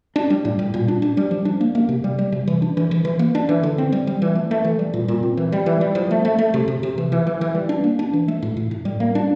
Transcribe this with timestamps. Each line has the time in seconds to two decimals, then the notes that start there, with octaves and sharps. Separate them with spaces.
0.16 D4
0.30 G3
0.45 A2
0.59 G3
0.74 A#2
0.88 D4
1.02 D4
1.17 G3
1.31 F3
1.45 D4
1.61 A#3
1.75 A#3
1.89 C3
2.04 G3
2.19 G3
2.32 C3
2.48 E3
2.62 D4
2.77 E3
2.91 E3
3.05 E3
3.19 A#3
3.35 D4
3.49 E3
3.63 D3
3.78 C4
3.92 G3
4.07 G3
4.22 E3
4.35 A3
4.51 A3
4.64 E3
4.79 G3
4.94 A#2
5.08 A#2
5.23 C4
5.37 E3
5.52 G3
5.66 E3
5.81 G3
5.95 F3
6.11 A3
6.25 A3
6.38 A3
6.54 C3
6.68 C3
6.83 C3
6.98 E3
7.12 E3
7.27 E3
7.41 E3
7.55 G3
7.69 D4
7.84 A#3
7.99 D4
8.13 E3
8.28 A3
8.42 A2
8.57 A2
8.71 A2
8.85 G3
9.00 A#3
9.15 D4